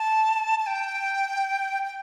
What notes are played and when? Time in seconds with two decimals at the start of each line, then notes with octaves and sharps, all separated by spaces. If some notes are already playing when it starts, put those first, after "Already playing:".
Already playing: A5
0.60 A5
0.67 G5
1.85 G5